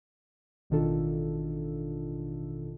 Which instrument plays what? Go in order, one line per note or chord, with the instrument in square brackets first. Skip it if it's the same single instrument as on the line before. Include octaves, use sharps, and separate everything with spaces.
[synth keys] A1 B2 D#3 D4 F4 A4